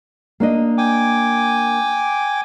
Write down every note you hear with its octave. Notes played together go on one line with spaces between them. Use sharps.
A#3 D4 D#5
G5 G#5 D6